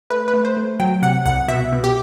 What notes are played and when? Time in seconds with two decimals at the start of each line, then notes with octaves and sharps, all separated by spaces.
0.10 A3 B4
0.28 B4
0.34 A3
0.45 C5
0.57 A3
0.80 F#3 G5
1.02 C3 F#5
1.26 C2 F#5
1.48 B2 E5
1.72 B2
1.84 G4